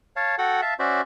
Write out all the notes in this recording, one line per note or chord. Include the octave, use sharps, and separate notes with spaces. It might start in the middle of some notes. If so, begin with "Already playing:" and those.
C#5 F5 A5
F#4 A4 F#5 G5
E5 F5 A5
C#4 F#4 C5 D5 E5